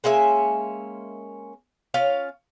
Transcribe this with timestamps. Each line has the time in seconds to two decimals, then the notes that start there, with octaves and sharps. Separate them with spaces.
0.04 G#3 A#3 C#4 E5
1.94 C#4 F4 F5